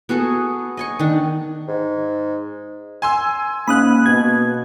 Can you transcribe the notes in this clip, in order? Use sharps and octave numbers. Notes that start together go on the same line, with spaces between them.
B3 F#4 G#4 A4
D#5 G#5 C#6
D#3 D4
G#2
G#5 C6 E6
G#2 A#3 C#4 F5 B5 D#6 F#6
B2 G#6